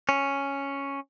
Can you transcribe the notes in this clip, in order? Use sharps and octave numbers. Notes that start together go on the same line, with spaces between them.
C#4